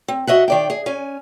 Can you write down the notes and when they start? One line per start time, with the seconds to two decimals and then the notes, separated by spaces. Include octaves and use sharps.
0.08 C4
0.27 F#4 D#5 E5 F#5
0.48 D#3 D5 G5
0.70 G#4
0.86 C#4 G#5